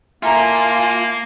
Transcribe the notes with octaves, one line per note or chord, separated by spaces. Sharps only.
A#3 E4 F4 A4 A#4 G#5